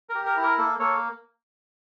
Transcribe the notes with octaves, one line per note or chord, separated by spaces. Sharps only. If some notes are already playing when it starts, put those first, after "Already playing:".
A#4
G4
A#4
E4
A#4
A#3 A4
A#3 A4 C#5